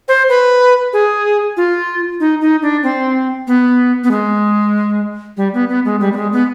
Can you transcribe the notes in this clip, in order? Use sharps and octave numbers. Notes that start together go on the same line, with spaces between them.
C5
B4
G#4
F4
D#4
D#4
D4
C4
B3
B3
G#3
G3
B3
B3
G#3
G3
B3
G#3
B3